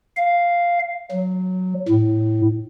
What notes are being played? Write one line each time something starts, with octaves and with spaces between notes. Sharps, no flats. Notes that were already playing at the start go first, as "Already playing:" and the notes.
F5
F#3
A2